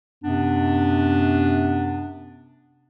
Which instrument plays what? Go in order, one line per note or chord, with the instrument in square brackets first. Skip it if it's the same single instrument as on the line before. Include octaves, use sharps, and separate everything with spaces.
[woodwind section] F#2 C3 B3 D4